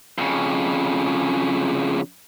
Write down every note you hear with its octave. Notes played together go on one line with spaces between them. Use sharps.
F2 C#3